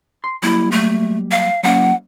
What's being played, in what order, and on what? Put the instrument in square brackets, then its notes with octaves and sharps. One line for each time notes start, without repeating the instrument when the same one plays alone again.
[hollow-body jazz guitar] C6
[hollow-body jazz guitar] F#3 G3 A#3 [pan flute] E4
[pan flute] A3
F5
[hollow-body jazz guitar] F#3 A#3 C#4 [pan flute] F#5